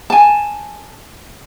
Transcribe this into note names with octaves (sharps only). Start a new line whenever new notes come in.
G#5 A5